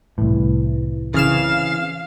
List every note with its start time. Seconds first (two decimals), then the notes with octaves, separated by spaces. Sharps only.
0.18 C2 A2 E3
1.14 C#3 E3 C4 F5 F6 E7